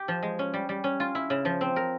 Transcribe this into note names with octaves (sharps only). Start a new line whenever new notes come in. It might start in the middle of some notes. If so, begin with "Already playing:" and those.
Already playing: G4
F3
G#3
C#4
G3
G3
C#4
F4
E4
C#3
F3
C4
A#4